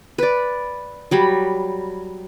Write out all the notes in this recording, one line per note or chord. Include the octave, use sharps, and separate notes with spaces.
B4 D5
F#3 G3 B5